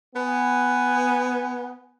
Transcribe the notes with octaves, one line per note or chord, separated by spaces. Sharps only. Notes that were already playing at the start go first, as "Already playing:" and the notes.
B3 G#5